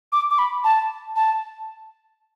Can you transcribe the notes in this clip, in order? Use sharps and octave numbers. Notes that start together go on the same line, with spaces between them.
D6
D6
B5
A5
A5